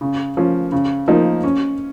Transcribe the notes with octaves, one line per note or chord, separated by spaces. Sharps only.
C#3
F3 C#4
C#3
F3 A#3 D#4
C#4